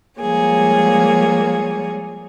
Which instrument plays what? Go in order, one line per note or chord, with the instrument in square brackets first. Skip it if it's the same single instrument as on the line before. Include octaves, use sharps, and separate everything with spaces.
[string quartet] F3 G3 G#3 A#3 G#4 C#5